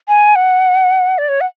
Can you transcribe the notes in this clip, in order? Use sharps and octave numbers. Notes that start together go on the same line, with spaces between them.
G#5
F#5
D5
C#5
F#5